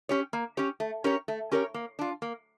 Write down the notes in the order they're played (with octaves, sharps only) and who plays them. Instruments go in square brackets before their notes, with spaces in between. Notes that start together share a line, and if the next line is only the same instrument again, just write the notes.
[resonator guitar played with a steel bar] C#4 G4 C#5
A#3
C#4 G4 C#5
A3
C#4 G4 A#4 C#5
A3
C#4 G4 A#4 C#5
A#3
D4 F4
A#3